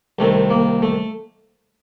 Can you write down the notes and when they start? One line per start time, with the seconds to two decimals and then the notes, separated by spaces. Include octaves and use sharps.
0.19 C2 C3 D#3 A3
0.50 A#3
0.82 A3